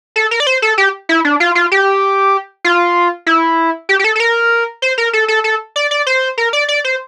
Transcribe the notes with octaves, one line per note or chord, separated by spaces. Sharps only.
A4
A#4
D5
C5
A4
G4
E4
D4
F4
F4
G4
F4
E4
G4
G4
A4
A4
A#4
C5
A#4
A4
A4
A4
D5
D5
C5
A#4
D5
D5
C5